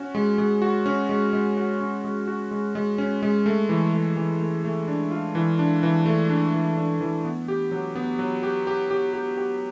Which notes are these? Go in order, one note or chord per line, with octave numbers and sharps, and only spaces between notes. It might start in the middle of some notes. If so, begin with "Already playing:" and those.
Already playing: C#4 F#4
G#3
G#3
F#4
C#4
G#3
G#3
F#4
C#4
G#3
F#4
G#3
G#3
C#4
G#3
A3
E3
A3
E3
A3
A3
D4
F4
E3
D4
E3
A3
D4
E3
D4
E3
B3
G4
F#3
B3
F#3
G4
G4
G4
G4
G4